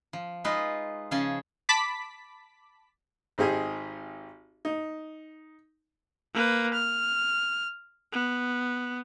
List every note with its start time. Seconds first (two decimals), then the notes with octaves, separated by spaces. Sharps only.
0.13 F3
0.44 G#3 D#4 F4 B4 D#5
1.11 C#3 F3 C#4 G#4 G#5 A5
1.69 A5 B5 D6 B6
3.38 G#1 C4 D#4 G4 G#4 G#5
4.65 D#4
6.34 A#3 B4
6.73 F6
8.13 B3